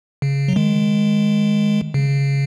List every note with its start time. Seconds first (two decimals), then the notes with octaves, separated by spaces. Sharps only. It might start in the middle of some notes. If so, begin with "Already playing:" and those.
0.22 C#3
0.48 F#3
0.56 D#3 G#3
1.94 C#3